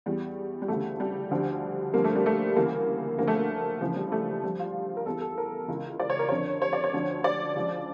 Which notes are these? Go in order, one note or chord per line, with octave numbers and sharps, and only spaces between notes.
E2 E3 G3
G3
D2 C#3 E3 A3
G3
D2 D3 F3
G2 D3 F3 A#3
A3
G3
A3
D2 C#3 E3 A#3
D2 D3 F3 A#3
A3
A#3
C#2 C#3 E3 F3
G3
A3
G2 F3 G3
F4
A#4
E2 E3 A4
A4
A#4
C#2 C#3 E3
D5
C#5
A#4
F2 D3 F3 C#5
C#5
D5
C#5
D2 D3 F3
D5
C#2 C#3 F3